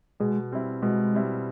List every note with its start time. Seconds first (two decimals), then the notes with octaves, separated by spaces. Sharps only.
0.20 B2 G#3
0.52 G3 C4 E4
0.82 B2 G#3
1.14 G3 C4 E4